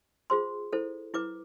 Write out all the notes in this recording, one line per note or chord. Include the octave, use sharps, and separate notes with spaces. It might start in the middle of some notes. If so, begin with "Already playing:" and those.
F4 G#4 C5 C6
E4 A4 C5
E4 B4 D6